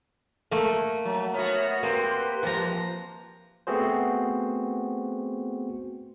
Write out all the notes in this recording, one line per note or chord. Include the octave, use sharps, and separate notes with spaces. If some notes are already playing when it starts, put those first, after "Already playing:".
A3 A#3
F#3
B3 F#4 C#5 E5 F6
A#3 C4 G4 B4 C6
F2 F3 A#5
A3 B3 C4 F#4 G#4 C5